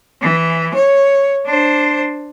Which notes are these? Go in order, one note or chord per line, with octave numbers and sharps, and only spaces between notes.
E3
C#5
D4 C5